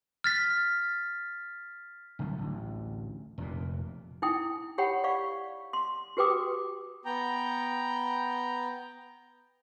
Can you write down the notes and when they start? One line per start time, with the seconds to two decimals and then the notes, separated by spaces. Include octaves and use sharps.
0.24 F6 A6 B6
2.19 C2 D3 F#3 A3
2.38 A1 D2
3.38 F1 D#2 A#2
4.22 D#4 E4 G5 D#6
4.78 G4 C#5 F#5 G5 B5
5.04 D5 F5 B5 C#6
5.73 C6
6.17 F#4 G4 B4 G5 D6 D#6
7.05 B3 G5 A#5